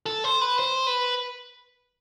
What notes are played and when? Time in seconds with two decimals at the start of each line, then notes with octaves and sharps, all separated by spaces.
0.06 A4
0.24 C5
0.41 B4
0.59 C5
0.87 B4